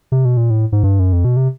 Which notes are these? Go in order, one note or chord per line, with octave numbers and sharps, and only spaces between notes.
C3
B2
A#2
A2
G#2
G2
F#2
F2
B2
C3